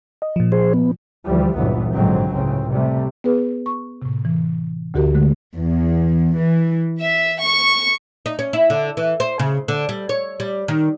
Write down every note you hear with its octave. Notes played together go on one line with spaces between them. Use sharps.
D#5
A#2 F3
G#4 C5
B3
D2 E3 F3 G3
G1 C#2 A#2 E3 F#3 B3
A#1 G#2 D3 F#3 C4
C#2 A2 C#3 C4
C3 G3 A3
B3 G#4 B4
C#6
A2 C3
E3
D2 D3 F#4 G4 A#4
D3 G#3 A3
E2
E3
E5
C#6
D#4
C#4
E4
D3
E3
C5
C#3
D3
G3
C#5
G3
D#3